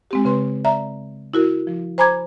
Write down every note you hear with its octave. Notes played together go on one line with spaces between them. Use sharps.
G#3 C4 G4
C#3 B4 C6
D5 E5 A#5
E4 F#4 A#4
F3
C5 G#5 A#5 B5 D6 G#6